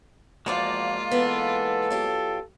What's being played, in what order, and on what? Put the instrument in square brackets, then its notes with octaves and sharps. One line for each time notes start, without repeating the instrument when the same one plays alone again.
[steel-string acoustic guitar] E2 F3 F#4 [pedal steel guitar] G#3 A#3 D5 [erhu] F4
[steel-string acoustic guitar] E3 B3 [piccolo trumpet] A4
[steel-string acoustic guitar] F#3 F4 G4